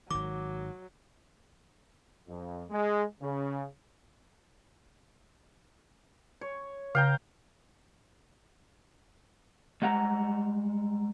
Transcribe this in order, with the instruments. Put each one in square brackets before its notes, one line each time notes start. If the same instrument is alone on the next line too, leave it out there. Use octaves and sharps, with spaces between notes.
[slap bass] G#1 D#3 [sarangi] F#3 [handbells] D6
[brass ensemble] F2
G#3
C#3
[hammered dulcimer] C#5
[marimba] C#3 [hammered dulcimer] F5 G5 A#5
[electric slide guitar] G3 G#3 F#5 A#5